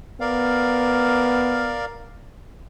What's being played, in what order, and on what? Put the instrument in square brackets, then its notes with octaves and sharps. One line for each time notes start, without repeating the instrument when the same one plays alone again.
[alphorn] B3 [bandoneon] A#4 D5 F5